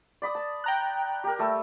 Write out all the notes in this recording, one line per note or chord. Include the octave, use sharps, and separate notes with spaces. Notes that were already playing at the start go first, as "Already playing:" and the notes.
D5 B5 D#6
A5
G5 A#5 F#6
G4 A#4
G3 A3 E6